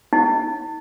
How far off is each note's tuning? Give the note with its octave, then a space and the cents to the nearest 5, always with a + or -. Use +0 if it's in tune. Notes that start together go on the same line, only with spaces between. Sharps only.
D#4 +40